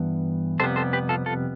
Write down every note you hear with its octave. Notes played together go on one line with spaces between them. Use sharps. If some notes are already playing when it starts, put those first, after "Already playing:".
Already playing: G2 E3 B3
F2 C3 G3 B3 A4 C5
A4 C5
G4 B4
F4 A4
F4 A4